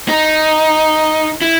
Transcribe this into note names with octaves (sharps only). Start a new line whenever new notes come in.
D#4
E4